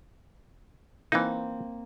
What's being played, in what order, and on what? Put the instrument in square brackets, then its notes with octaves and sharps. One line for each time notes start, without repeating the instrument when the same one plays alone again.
[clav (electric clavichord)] E3 D#4 [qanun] A#3 C4